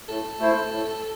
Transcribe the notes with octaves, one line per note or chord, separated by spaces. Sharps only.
A2 A4
A3 E4 C5
A2